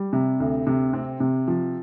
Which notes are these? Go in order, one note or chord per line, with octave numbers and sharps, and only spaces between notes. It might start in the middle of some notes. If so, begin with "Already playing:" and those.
Already playing: G3
C3
D2
C3
C4
C3
F3